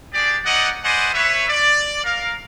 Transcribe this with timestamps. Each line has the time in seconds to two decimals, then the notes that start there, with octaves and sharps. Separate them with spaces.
0.13 D4 G4 G#4 D5
0.45 C#4 D#4 D5 D#5 F#5
0.84 B4 C5 D5 D#5 F#5 G#5
1.14 B4 C#5 E5
1.49 D5
2.04 A#4 F5